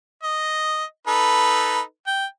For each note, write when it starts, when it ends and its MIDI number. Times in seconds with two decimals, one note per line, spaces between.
0.23 0.84 75
1.07 1.81 63
1.07 1.81 69
1.07 1.81 71
2.07 2.25 79